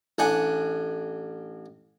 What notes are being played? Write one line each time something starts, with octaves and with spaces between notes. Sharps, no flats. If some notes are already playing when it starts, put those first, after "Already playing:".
A1 D4 F#5 G#5